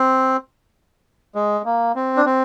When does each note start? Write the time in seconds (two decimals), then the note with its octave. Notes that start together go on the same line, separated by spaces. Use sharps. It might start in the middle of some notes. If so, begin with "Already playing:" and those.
Already playing: C4
1.35 G#3
1.65 A#3
1.96 C4
2.17 D4
2.25 C4